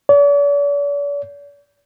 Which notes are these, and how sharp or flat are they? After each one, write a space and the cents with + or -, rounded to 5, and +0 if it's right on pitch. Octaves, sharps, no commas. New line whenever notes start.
D5 -45